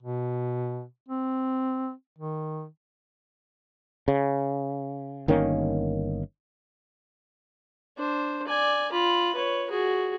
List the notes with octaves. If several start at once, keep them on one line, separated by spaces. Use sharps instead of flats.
B2
C4
D#3
C#3
G1 D#3 A#3 C#4
D4 C5
D5 G#5
F4 B5
B4 C#5
F#4 G#4